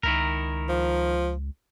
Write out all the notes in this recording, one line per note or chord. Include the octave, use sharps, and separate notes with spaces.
C#2 D#3 E4 A#4
F3